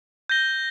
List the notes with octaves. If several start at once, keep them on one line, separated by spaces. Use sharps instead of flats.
G6 A#6 G7